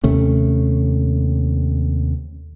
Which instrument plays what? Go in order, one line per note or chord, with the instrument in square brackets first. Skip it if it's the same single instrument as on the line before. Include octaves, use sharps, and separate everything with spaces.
[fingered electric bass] D#2 C3 A3 C#4